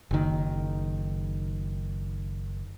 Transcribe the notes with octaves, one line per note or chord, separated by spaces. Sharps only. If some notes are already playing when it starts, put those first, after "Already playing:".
F#1 D#3